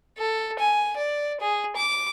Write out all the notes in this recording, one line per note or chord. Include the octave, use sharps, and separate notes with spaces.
A4
G#5
D5
G#4
D6